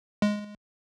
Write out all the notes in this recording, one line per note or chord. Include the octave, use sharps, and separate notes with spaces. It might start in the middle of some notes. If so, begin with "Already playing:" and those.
G#3